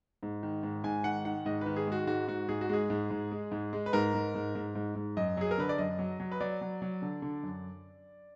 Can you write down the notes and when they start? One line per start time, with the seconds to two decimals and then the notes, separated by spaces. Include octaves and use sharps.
0.23 G#2
0.43 D#3
0.63 G#2
0.84 G#2 G#5
1.04 D#3 F#5
1.25 D#3 F#5
1.45 G#2 D#5
1.61 D#3 B4
1.76 G#4
1.87 G#3 F#4
2.07 G#2 F#4
2.28 G#2 F#4
2.49 G#2 G#4
2.61 F#4
2.69 G#3 G#4
2.90 G#2
3.10 G#2
3.32 G#3
3.52 G#2
3.73 G#3
3.86 B4
3.93 G#2 A#4
4.14 G#2
4.35 G#2
4.55 G#2
4.75 G#2
4.95 G#2
5.17 F#2 D#5
5.37 F#3 G#4
5.51 A#4
5.58 D3 B4
5.69 D5
5.78 F#2 D#5
5.99 F#3
6.20 F#3
6.32 B4
6.40 F#3 D5
6.61 F#3
6.82 F#3
7.02 D3
7.22 D3
7.43 F#2